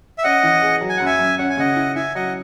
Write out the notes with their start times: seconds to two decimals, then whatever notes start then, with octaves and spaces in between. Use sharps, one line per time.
0.18 E5
0.24 C#4 D#5 F#5
0.43 E3
0.62 G#4
0.81 F#3
0.89 G#5
0.97 F#2 F#5
1.06 E5 G#5
1.19 F#2
1.38 C#4 F#5
1.50 G#5
1.57 C#3 D#5 F#5
1.76 E4
1.95 E4 E5 G#5
2.15 F#3 D#5 F#5